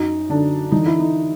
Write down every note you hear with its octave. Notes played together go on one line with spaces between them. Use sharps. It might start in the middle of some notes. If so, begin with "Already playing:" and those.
Already playing: F#2 D#4
D3 D4
E3 D#4
E4
D#4